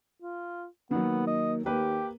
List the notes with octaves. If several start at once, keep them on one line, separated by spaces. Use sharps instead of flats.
F4
D#3 F#3 A#3 B3
D#5
D#2 A#3 G4 B4